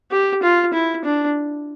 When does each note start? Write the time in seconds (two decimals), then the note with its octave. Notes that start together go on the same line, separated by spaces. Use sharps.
0.11 G4
0.43 F4
0.73 E4
1.05 D4